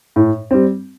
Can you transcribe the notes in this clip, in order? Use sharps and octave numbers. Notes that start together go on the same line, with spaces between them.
A2
G3 C4